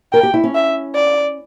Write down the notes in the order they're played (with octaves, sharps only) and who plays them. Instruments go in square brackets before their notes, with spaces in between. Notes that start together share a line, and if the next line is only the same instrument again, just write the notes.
[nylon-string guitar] A#4 [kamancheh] G5
[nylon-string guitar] G4
E4
C#4
[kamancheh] E5
D5